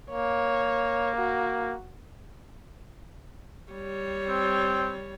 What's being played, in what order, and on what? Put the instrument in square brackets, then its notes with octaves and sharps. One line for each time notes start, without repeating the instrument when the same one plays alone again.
[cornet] A#3 [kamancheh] C#5
[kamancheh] F#4
[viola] G3 C#5
[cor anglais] C4